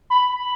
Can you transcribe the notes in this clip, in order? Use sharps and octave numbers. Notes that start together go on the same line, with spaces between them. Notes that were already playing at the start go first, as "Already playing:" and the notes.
B5